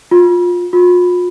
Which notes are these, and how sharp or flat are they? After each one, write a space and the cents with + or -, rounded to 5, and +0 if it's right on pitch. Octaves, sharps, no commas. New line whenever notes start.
F4 +20
F4 +40